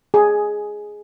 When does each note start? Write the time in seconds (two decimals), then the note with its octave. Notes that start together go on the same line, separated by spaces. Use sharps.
0.14 G#4